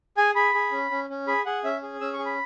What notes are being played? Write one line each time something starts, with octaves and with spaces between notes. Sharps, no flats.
G#4 G#5
G#4 B5
G#4
C#4
C#4
C#4
G#4 B5
G#4 F#5
C#4 E5
G#4
C#4 E6
C#6
G#4
B5